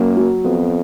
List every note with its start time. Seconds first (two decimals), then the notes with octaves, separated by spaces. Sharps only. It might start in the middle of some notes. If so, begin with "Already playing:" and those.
Already playing: F#2 A#3
0.17 F#3
0.44 F2 B3